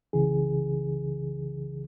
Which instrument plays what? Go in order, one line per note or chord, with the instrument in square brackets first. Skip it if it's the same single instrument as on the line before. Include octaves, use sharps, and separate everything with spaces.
[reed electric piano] C2 C#3 E3 G#4